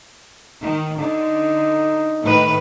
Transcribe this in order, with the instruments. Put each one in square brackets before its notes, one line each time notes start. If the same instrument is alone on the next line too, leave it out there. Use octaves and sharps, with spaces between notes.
[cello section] D#3
[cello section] D3 [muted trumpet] D#4
[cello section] A2 D#3 B4